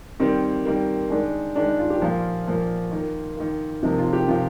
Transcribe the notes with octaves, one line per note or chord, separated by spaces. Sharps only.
D#3 G3 A#3 C4
D#3 G3 A#3
D#3 G#3 D4
D#3 G#3 D4
D#4
F4
G4
A#2 F3 A#3 F4
A#2 F3 A#3
D#3 A#3
D#3 A#3
C3 F3 A#3 D#4
F4
G4
C3 F3 A#3 F4